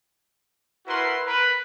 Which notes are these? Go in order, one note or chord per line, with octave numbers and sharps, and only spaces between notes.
E4 F#4 A#4 B4 C6
A#4 B4